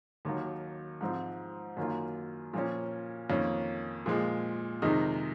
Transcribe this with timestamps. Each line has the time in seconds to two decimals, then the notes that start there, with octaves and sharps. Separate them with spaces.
0.25 D#2 D#3 F#3 A#3
1.01 G#2 F3 C4
1.77 F#2 D#3 A#3 F4
2.53 A#2 F3 A#3 C#4
3.29 F2 D#3 A#3 C#4
4.06 A#2 F3 G#3
4.82 F2 C3 D#3 G#3 D#4